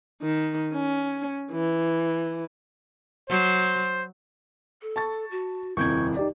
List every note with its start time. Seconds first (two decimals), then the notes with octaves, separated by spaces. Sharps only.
0.22 D#3
0.74 C#4
1.52 E3
3.29 F#3 C5
4.82 A4
4.96 A5 C#6 A6
5.31 F#4
5.77 D#1 F2 C3 E4 C#6 G6 G#6
6.17 D#4 G4 D5